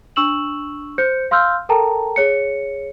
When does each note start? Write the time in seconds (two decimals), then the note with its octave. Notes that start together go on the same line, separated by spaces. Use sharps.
0.16 D4 C#6 E6 E7 F#7
0.98 C5 G6 C#7
1.31 F5 C6 E6 F6 G6
1.69 A4 A#4 G5 A5 A#5
2.16 G#4 C#5 C#7